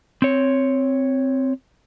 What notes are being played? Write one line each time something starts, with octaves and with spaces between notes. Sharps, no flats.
C4 C#5